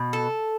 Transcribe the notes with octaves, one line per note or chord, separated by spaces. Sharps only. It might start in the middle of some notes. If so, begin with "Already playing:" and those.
Already playing: B2
A4